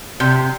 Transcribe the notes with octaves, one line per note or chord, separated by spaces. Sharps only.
C3